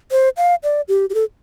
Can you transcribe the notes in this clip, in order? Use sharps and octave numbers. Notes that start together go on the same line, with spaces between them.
C5
F5
D5
G4
G4
A4